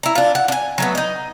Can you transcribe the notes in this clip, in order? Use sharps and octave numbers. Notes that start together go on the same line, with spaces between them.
E4 A#5
D4 F4
F#5
D4 G#5
F#3 A3 B3
D#4 D#5